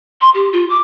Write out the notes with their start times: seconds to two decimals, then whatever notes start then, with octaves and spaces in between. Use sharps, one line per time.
0.20 C6
0.34 G4
0.52 F4
0.69 D6